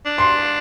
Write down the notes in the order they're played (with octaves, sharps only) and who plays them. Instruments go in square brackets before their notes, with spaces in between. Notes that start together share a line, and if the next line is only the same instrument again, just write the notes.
[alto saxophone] D4
[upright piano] C6